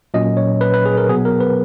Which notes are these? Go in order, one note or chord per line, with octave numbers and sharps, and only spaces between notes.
A#2 F#3 C#4 D#5
C#5
B4
B4
G#4
A#4
B2 F#3 B3 G#4
A#4
B4